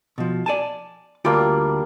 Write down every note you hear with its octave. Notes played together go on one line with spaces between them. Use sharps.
B2 F3
D5 G#5 A5
D2 G3 A#3 D4 F4 G5